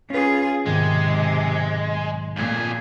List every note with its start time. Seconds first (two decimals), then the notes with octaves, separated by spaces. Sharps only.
0.10 C#4 F4 G#4 B4
0.66 B1 G#2 C3 D#3 G#3
2.36 F2 A#2 G#4